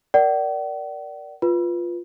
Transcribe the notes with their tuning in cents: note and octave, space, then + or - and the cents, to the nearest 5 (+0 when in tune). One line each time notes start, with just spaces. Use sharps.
A#4 +5 D5 +0 F#5 +45
F4 +0 B4 +0